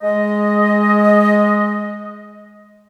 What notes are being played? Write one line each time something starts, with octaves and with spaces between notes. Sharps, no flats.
G#3 D#5